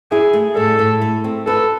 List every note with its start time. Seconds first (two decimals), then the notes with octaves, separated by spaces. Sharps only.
0.11 E4 G#4
0.33 A3
0.56 A2 A4
0.79 A2
1.01 A3
1.24 C4
1.47 A4 B4